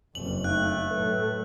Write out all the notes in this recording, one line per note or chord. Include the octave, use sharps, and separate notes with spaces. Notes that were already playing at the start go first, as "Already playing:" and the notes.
F#1 F2 F#7
A3 D#4 F5 G5 F#6
A2 F#3 A4 B4